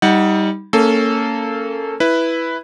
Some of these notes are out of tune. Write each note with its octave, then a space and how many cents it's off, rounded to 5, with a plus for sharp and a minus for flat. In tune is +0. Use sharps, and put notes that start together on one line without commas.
G3 +0 D#4 +25 F#5 +0
A#3 -25 C#4 +0 A4 -10
E4 +0 B4 +0